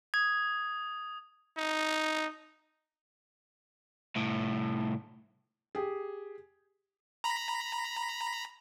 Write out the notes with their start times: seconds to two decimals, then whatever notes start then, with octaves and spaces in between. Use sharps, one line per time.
0.14 D#6 G#6
1.58 D#4
4.16 C2 A2
5.75 G4 G#4
7.24 A#5 B5